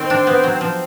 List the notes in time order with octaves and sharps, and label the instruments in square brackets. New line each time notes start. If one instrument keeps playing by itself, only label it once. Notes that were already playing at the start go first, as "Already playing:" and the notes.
Already playing: [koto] D#3 [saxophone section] C4
[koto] D4
B3
F#3
[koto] F3 [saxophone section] C4